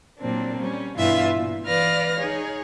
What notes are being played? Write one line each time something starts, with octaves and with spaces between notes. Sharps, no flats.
A#2 F#3 A#3 C4 D4
G3 C#4
G2 B2 E3 F4 E5
A#2
E3 B4 D5 F5 F6 A#6
D#4 G#4 C#5